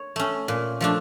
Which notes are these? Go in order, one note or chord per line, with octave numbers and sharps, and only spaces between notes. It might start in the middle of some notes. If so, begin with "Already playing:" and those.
Already playing: C#5
A3 C#4
A#2
F3 A3 D4